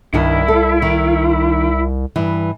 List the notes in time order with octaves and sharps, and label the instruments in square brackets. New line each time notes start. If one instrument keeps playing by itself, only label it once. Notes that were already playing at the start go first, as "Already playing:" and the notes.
[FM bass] C2 [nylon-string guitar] G2 D#3 D4 [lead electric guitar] E4
[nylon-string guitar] A4
D#3
G2 E3